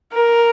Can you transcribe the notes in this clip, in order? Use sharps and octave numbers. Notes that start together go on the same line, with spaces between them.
A#4